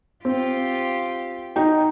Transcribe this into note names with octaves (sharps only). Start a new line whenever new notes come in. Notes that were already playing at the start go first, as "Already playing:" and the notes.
C4 F4 G4
D#4 F#4 G5